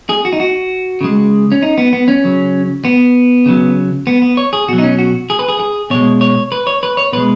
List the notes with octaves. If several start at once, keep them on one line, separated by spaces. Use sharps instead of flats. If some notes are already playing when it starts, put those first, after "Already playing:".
G#4
F#4
D#4
F#4
C#3 G#3
C#4
D#4
B3
B3
C#4
C#3 F#3
B3
C#3 F#3
B3
B3
C#5
G#4
B2 F#3 F#4
D#4
C#4
F#4
G#4
B4
G#4
G#4
B2 G#3 C#5
C#5
B4
C#5
B4
C#5
B2 G#3 B4